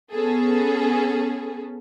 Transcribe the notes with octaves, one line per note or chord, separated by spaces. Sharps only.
B3 C#4 G#4 A4